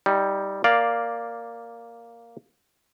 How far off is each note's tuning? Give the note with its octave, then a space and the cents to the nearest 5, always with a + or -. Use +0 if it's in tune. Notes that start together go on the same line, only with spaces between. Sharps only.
G3 +0 D#4 +25
A#3 +0 D5 +0 F5 +0